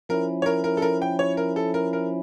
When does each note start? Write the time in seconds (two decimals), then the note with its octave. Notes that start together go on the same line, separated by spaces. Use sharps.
0.09 F3 C#4 E4 A#4
0.42 C#5
0.46 A#4
0.64 A#4
0.77 A4
0.82 A#4
1.02 G5
1.19 C#5
1.37 A#4
1.56 A4
1.74 A#4
1.93 A#4